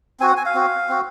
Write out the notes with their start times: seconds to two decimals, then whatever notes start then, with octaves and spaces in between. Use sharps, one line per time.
0.20 C4 F#4 G#5
0.28 F#5
0.37 G#5
0.45 F5
0.54 C4 F#4
0.89 C4 F#4